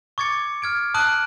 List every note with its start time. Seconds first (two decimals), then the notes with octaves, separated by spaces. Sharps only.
0.18 C#6 D6 G#6 A6 C#7
0.62 F6 G#6 D7
0.94 A5 D#6 F#6 D7 F#7